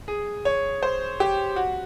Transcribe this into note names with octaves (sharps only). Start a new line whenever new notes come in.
G#4
C#5
C5
G4
F#4